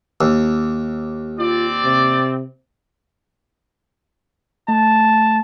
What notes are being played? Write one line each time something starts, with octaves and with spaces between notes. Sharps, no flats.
D#2
C4 F4 D5
C3
A3 A5